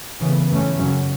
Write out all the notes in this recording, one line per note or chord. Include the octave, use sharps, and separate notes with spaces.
C#3 E3 B3
F#2 E3 A3 C#4
F#2 C#3 F#3 C#4